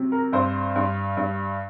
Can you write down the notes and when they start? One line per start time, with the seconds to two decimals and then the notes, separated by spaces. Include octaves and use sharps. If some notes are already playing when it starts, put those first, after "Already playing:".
Already playing: C3 F#3
0.12 A#4
0.33 G2 C5
0.75 G2
1.17 G2